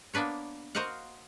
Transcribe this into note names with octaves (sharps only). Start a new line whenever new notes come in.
A#3 B3 D4 B4 C#5
F#4 A#4 C5 D#5 F5 F#5